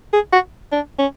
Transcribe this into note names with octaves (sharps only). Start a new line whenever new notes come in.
G#4
F#4
D4
C#4